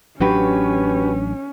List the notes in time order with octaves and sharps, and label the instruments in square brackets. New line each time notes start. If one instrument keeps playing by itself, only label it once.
[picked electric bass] A1 F#3 D4 [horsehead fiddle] C#4 [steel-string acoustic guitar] F#4 G4 B4